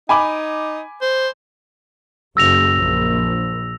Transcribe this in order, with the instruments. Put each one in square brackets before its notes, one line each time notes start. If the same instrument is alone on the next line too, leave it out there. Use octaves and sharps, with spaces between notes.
[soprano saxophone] D#4 [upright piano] G#5 B5 D6
[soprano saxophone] C5
[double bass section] F#1 [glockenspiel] E6 A#6 F7
[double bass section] A#1